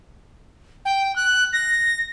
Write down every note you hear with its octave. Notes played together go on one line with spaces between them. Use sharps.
G5
F#6
A#6